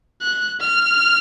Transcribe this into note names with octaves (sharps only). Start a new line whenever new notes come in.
F#6
F6